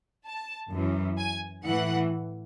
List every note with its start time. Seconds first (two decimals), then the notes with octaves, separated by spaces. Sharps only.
0.26 A5
0.72 F#2 E3
1.18 G#5
1.65 A2 E3 F#5